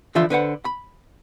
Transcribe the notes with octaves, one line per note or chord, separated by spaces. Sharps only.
D3 E3 F3 F4 E5 C6
D3 B4 C5 F#5
B5